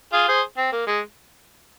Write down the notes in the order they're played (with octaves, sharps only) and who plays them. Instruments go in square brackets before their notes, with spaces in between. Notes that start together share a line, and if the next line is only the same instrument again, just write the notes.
[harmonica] F4 G#4
G#4 C5
C4
A#3
G#3